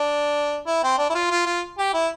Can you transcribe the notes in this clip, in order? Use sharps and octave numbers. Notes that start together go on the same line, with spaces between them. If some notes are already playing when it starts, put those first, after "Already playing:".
Already playing: D4
E4
C4
D4
E4
F4
F4
F4
G4
E4